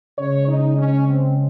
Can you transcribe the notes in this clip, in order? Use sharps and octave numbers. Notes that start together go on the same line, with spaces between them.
C#3 G#3 C#5
D#4
C#4
C4